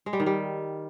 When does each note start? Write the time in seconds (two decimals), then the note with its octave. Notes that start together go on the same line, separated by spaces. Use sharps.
0.06 G#3
0.13 G3
0.20 D#3
0.26 G3